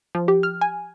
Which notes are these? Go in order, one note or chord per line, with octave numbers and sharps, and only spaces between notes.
F3
G4
F6
G#5